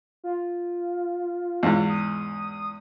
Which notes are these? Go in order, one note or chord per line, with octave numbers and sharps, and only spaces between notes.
F4
E2 G#2
D#6